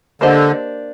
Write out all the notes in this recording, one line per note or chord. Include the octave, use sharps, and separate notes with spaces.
D3 A#3 D4 G4 C5 D#5